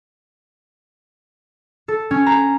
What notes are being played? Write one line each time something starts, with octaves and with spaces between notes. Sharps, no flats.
A4
C#4
A#5